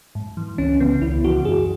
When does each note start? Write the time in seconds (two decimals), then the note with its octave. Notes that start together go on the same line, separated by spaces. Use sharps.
0.15 G#2
0.37 E3
0.58 C#2 C#4
0.80 C#3 E3 B3
1.01 C#2 E4
1.24 C#3 E3 F#4
1.45 F#2 G#4